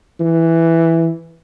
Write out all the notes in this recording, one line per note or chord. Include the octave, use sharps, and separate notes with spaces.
E3